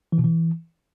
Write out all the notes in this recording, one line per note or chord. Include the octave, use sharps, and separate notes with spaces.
E3
B2
E3